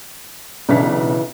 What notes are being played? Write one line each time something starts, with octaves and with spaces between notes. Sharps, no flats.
B1 C#3 E3 D4 B6